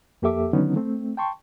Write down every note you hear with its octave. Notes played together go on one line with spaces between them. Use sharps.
F2 A#3 G4 A4 E5 D6
D3 D#3 F#3 B3 C#4 D#4
A3 C4
G5 A5 C6 C#6